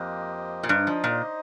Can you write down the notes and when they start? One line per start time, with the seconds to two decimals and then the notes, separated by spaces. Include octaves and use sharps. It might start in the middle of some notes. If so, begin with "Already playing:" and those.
Already playing: F2 A#3 G4 C5 D#5
0.63 A#2
0.69 G2 D#4 C5 D#5
0.87 F3
1.04 A#2